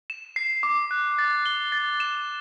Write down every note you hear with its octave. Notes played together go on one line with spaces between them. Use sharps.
E7
C7
D6
F#6
A6
G7
A6
E7